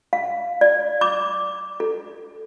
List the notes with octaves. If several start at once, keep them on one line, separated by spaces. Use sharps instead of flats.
F5
D5
D6
A4